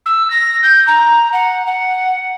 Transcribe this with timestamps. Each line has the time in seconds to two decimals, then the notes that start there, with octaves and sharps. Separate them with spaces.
0.06 E6
0.30 A#6
0.63 G6
0.87 A#5
1.33 F#5
1.66 F#5